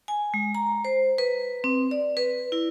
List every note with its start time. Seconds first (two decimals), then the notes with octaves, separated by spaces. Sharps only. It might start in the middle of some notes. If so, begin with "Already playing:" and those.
0.08 G#5
0.34 G#3
0.55 A#5
0.85 C5
1.18 B4
1.64 C4
1.91 D5
2.17 B4
2.52 E4